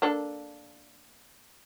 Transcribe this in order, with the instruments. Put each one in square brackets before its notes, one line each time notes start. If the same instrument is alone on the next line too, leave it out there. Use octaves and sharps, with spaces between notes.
[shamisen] A#3 D4 A4